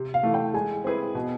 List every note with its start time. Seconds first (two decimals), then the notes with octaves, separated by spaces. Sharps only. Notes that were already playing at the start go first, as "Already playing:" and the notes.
Already playing: C3
0.14 F5
0.23 E3 A3
0.34 G5
0.54 G#3 G#5
0.84 C4 E4 G#4 B4
1.15 B2